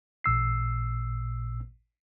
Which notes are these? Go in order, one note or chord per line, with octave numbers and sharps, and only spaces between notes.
A1 A#2 E6 C7